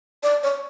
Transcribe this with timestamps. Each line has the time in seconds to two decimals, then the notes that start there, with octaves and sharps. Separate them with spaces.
0.23 D5
0.43 C#5